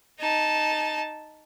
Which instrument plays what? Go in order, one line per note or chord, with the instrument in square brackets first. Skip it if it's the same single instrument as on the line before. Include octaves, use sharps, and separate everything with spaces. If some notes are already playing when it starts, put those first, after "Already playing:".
[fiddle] D#4 A5